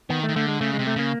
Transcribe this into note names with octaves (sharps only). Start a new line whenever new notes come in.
D#3 B3
A3
D#3
D3 A3
G#3
C#3 A3
G#3
C3
A3
C#3 A#3